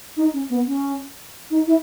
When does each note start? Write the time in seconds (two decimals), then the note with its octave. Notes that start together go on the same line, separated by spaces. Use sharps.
0.17 D#4
0.33 C#4
0.50 B3
0.67 C#4
1.50 D#4
1.67 E4